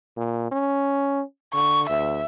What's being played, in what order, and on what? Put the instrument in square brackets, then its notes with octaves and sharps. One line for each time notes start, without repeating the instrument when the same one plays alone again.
[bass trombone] A#2
C#4
[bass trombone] D3 [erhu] C#6
[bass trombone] D2 [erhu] E5